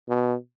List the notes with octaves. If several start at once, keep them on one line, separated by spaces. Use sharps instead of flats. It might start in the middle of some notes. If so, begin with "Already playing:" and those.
B2